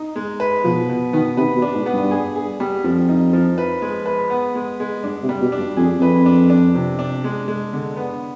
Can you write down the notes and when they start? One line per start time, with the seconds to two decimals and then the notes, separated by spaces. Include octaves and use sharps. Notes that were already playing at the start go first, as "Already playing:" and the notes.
Already playing: D#4
0.16 G#3
0.40 B4
0.64 B2 F3
0.89 B2
1.13 D#3 B3
1.37 C3 B4
1.56 B2
1.62 D4
1.74 G#2
1.86 B3
1.93 G2
2.11 G#4
2.36 G#4
2.60 G3
2.84 F2 F3
3.09 D#4
3.33 F3
3.58 B4
3.82 G#3
4.06 B4
4.30 B3
4.55 G#3
4.80 G#3
5.03 G2 D4
5.23 C3
5.29 G3
5.41 B2
5.52 D4
5.58 G2
5.77 F2 G#4
5.99 F2 B4
6.26 D4
6.50 D4
6.75 C3
6.99 D4
7.24 G#3
7.48 G#3
7.73 D3
7.97 B3